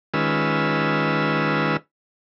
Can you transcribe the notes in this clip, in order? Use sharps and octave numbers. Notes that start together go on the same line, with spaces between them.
D#3 G#3 C#4 F4 B4 E6